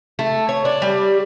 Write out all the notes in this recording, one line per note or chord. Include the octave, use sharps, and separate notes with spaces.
A3
C#5
D4
G3